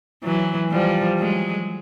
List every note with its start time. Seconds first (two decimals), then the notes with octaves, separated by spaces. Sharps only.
0.24 E3 F#3
0.71 F3 G3
1.19 F#3 G#3